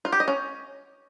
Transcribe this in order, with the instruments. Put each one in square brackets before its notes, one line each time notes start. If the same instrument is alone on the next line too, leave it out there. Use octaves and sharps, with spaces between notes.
[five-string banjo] F4
G4
D#5
C#4